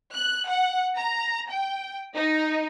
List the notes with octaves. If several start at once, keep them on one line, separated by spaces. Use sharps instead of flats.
F#6
F#5
A#5
G5
D#4